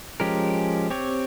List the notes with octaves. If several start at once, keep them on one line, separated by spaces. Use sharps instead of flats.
F3 G#3 C#4 G4 A#4
C4 G4 C#5